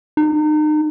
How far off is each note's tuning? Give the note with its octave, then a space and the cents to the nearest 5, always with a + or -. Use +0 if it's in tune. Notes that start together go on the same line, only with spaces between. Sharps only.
D#4 -35